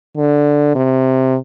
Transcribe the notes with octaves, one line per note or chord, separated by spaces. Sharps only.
D3
C3